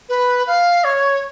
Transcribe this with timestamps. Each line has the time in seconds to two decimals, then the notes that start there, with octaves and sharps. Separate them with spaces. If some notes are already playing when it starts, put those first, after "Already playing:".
0.09 B4
0.47 F5
0.84 C#5